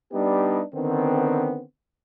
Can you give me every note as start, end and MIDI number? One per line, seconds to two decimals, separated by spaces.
0.13 0.62 55
0.13 0.62 59
0.13 0.62 62
0.13 0.62 63
0.13 0.62 67
0.75 1.62 50
0.75 1.62 51
0.75 1.62 59
0.75 1.62 60